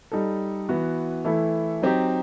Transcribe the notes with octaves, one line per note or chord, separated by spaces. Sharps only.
G3 D#4 A4
E3 B3 F#4
E3 A3 E4 A4
F#3 C4 D#4 G4